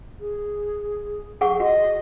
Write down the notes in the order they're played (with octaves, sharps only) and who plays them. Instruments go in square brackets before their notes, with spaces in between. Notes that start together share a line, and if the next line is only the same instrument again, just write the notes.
[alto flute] G#4
[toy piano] G#4 F#5 C#6
[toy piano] F#4 [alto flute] D#5